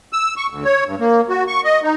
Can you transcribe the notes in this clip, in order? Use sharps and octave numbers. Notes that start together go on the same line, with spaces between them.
E6
C#6
D2
C#5
G2
A#3
F#4
C#6
D#5
D#4